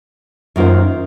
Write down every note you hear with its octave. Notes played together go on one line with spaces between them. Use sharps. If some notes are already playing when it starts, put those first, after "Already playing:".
F#2 D#3 A#3 F4 C5